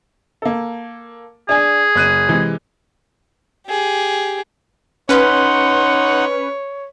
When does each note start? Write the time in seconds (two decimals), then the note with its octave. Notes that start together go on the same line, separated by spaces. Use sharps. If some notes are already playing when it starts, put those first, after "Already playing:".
0.42 A#3 A4
1.49 D4 G#4 G#5
1.95 F#1 F#6 D#7
2.28 C3 E3 G#3
3.67 G4 G#4
5.09 C#4 D#4 B4 C#5 F#5 C6